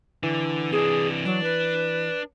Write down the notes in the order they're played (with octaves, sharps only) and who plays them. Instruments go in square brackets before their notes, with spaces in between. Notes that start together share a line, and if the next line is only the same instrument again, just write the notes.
[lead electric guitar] D3 [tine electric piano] E3
[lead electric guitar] C3 D4 [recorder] G#4
[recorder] F#3 [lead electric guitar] D4
[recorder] B4